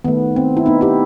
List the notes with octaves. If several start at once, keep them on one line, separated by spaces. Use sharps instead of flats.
D#3 A3 B3
C4
E4
B3 D#4
E4 G4